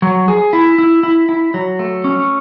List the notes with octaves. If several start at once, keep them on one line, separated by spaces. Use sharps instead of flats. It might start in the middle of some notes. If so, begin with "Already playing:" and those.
F#3
G#4
E4
E4
E4
E4
F#3
A3
C#4